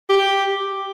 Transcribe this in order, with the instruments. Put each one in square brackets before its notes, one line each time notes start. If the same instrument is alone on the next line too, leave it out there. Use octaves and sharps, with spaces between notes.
[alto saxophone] G4